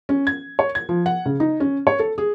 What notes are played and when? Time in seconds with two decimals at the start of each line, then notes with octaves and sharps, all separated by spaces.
0.09 C#4
0.27 G#6
0.59 C#5
0.75 G#6
0.89 F3
1.06 F#5
1.26 C#3
1.40 D#4
1.60 C#4
1.87 C#5
1.99 A4
2.18 G#4